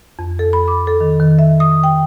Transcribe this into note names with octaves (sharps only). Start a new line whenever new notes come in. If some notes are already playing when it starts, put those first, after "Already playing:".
F2
A4
B5
D6
A4
D#3
D#3
E5
D#6
G5